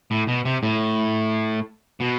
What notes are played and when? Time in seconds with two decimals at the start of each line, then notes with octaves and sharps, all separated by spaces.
0.11 A2
0.28 B2
0.45 C3
0.63 A2
2.00 B2